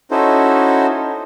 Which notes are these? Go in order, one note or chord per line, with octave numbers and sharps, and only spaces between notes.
C#4 D#4 E4 F#4 A4 C5